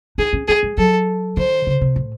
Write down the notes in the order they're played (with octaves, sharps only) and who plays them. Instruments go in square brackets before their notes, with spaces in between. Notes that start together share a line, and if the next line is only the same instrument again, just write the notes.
[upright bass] D#4 [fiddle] G#4
[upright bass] C#4
[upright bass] C4 [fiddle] G#4
[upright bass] G#3
[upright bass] F#3 [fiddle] A4
[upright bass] D#3 [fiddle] C5
[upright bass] C#3
C3
A2